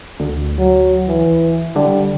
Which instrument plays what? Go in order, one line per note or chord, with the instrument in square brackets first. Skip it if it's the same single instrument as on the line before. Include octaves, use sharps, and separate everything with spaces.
[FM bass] D2
[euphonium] F#3
E3
[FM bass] D3 [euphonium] G3